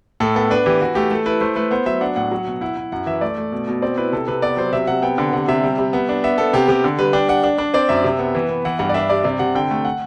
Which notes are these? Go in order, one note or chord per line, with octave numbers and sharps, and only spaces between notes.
A2 A4
B3 A4
D4 B4
E3 G4
E3 F#4
A3 G4
A3 A4
E4 B4
A3 C5
A3 B4
B3 C5
F#3 E5
D4 F#5
A2 F#5
F#3
B2
E4 F#5
E4
F#2 F#5
E3 E5
A3 D5
A3
B2
B2
C4 D5
E4 B4
C3 A4
C3 B4
B3 D5
F#3 C5
C3 E5
C3 F#5
B3 G5
D3
C3 F#5
C3 E5
G3
G3
B3
D4
B3 E5
B3 A4
C3 G4
C3 G4
D3
G3 B4
D4 G5
D4 F#5
D4
D4
C4 D5
F#2 E5
C3
B3
E3
B3
E3 F#5
G2 F#5
D5
D4 E5
G3 D5
C3 D5
C3 F#5
D3 G5
A3
F#5